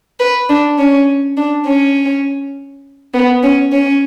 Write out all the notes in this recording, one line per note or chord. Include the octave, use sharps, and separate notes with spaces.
B4
D4
C#4
D4
C#4
B3
C#4
C#4